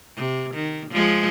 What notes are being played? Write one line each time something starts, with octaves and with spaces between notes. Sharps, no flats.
C3
D#3
F3 G#3